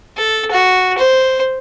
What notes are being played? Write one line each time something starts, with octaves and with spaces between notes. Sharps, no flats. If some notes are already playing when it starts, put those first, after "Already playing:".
A4
F#4
C5